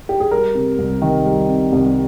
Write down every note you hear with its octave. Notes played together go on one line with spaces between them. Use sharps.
G4
G#4
G3 A#4
C3
C2
D#3
G3
C3
C2